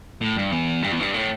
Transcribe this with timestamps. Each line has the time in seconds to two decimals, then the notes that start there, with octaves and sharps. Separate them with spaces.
0.21 A2
0.36 G2
0.51 E2
0.82 G2
0.92 E2
1.00 G2
1.14 A2